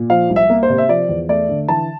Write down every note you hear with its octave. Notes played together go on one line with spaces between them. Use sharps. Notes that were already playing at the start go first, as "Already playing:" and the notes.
Already playing: A#2
F3 F5
C2
E5
A#3
C5
C3
E5
F3 D5
E2
A3 D5
D3
E3 A5